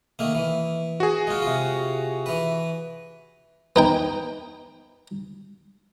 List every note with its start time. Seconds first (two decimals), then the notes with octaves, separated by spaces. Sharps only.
0.19 D#3 A3 A#3
0.35 E3
1.00 F#4 G#4
1.27 G#3 F4
1.42 C3 F4
2.26 E3 B4
3.76 B3 D#4 G5